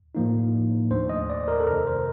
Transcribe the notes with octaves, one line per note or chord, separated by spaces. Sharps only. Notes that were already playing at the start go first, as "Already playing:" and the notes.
A2 F3 A#3 D#4
D#2 D#3 A3 D4 C5
D#5
D5
A#4
A4
F2 C3 D#3 A#4
C5